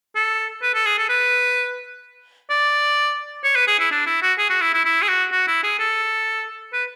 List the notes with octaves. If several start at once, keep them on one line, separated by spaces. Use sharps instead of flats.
A4
B4
A4
G#4
A4
B4
D5
C#5
B4
G#4
E4
D4
E4
F#4
G#4
F#4
E4
E4
E4
G#4
F#4
F#4
E4
G#4
A4
B4